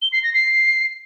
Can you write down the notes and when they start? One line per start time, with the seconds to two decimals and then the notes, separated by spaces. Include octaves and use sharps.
0.02 G7
0.12 C7
0.23 A#6
0.34 C7